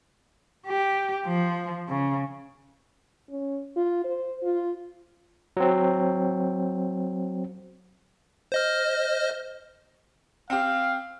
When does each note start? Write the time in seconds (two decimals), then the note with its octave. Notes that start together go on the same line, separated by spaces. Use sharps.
0.67 G4
1.26 F3
1.89 C#3
3.30 C#4
3.76 F4
4.05 C5
4.43 F4
5.57 F#3 C4
8.52 C5 D#5 F6
10.50 C4 G4 F5